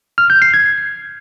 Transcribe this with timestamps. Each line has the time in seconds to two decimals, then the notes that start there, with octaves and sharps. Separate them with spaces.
0.18 F6
0.30 G6
0.42 C7
0.54 G#6